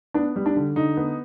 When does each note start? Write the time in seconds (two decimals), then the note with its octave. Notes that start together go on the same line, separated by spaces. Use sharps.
0.14 B3 D4
0.36 G3
0.46 D4
0.56 D3
0.76 D3 D#4
0.97 B3